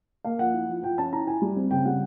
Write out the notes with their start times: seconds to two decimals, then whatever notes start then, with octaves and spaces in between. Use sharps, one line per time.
0.24 A#3 F5
0.39 F3 F#5
0.54 E4
0.69 F3
0.83 F3 G5
0.98 C#4 A5
1.13 E4 A#5
1.26 E4 G#5
1.42 G3
1.56 C4
1.71 C#3 G5
1.85 G3 F#5